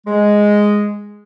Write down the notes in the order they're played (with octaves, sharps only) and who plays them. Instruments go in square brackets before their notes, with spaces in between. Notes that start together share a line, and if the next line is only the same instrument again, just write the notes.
[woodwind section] G#3